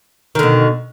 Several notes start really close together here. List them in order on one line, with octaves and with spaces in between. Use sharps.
D#3 D3 B2